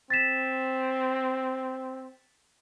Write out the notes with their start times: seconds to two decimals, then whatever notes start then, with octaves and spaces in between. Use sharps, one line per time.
0.10 C4 A6 B6 E7